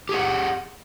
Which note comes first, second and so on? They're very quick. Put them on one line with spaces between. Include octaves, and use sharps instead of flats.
G4 G#4 F#5